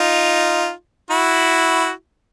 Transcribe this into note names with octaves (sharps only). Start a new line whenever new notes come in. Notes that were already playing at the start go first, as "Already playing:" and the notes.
Already playing: D#4 F4
E4 F#4